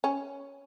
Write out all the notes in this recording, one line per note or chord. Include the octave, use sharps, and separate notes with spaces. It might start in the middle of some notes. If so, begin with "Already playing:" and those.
C#4